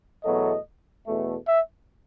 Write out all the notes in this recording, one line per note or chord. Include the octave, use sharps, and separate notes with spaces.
E2 B2 F#3 A3 D#5
E2 B2 A3
E5